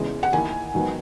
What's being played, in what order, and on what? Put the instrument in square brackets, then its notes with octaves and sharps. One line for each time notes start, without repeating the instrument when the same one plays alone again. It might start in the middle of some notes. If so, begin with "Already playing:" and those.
Already playing: [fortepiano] E2 C#3 E3 G#3
[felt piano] F#5
[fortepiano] D#3 A#3 E4 [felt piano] G#5
[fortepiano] G#2 D#3 F#3 B3